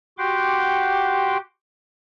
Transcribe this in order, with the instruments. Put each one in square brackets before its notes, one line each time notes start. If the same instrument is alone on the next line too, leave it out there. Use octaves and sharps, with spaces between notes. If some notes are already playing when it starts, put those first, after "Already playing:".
[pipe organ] F#4 G4 F#5 G5 C6 D6